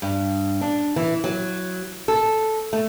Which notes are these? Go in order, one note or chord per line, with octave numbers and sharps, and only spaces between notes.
G2
D4
E3
F#3
A4
A3